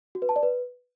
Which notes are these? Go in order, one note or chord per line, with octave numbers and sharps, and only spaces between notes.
F#4
B4
A5
D5
B4